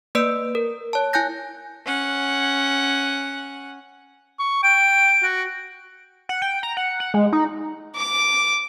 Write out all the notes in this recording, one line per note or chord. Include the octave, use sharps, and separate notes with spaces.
A#3 B4 D5 E6 D7
A#4
C#5 A5
E4 G#5 F#6 G6 A#6
C#4 F#5
C#6
G5 D7
F#4
F#5
G5
A#5
F#5
F#5
G#3
D#4
D6